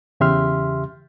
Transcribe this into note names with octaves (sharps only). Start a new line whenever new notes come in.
E2 C#3 G4 E5 C6 F6